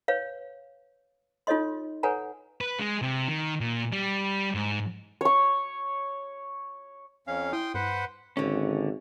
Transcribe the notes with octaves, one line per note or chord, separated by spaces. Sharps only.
B4 C#5 F5
D#4 F4 A4 C#5 D#5 C6
A4 B4 C#5 F#5 G#5 A#5
B4
G#3
C3
D#3
A#2
G3
G#2
C#5 C#6
F2 C#4 F5
E4 G5 C6 D#6
G2 B4 C5 F#5
G#1 D3 C#4